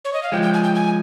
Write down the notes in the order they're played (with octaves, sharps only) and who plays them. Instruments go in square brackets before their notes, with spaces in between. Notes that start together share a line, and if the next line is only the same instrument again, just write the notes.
[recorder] C#5
D#5
F5
[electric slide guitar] F3 G#3 [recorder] G5
[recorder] G5
G#5
G5
G#5